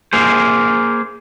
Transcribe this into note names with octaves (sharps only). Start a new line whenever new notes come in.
A#3 G#4 C5